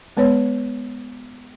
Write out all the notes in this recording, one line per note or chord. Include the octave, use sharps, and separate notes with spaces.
G#3 B3 B4 C#5